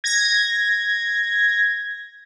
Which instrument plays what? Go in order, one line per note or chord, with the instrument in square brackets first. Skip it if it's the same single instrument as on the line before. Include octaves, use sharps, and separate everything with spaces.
[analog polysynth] G#6 A#6